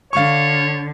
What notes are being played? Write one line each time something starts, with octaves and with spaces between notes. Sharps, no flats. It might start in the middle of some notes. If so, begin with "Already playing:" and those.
D3 C#5 F5 C#6